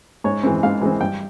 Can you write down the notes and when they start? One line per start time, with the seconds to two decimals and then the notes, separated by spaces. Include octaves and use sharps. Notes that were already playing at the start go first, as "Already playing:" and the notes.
0.24 G#2 C#5
0.43 E3 G#3 C4
0.63 G#2 F5
0.81 E3 G#3 C4
1.01 G2 G5